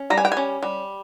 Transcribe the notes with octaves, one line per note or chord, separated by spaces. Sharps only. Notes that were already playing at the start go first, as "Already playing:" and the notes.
Already playing: C#4
G3 A#5
G#5
G5
G#5
C#4
G3